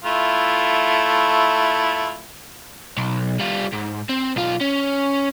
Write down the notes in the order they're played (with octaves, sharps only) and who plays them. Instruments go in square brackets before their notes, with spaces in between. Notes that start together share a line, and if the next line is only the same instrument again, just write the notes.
[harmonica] A3 E4 F4
[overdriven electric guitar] B1
G3 F4
G#2
C4
B1 F4
C#4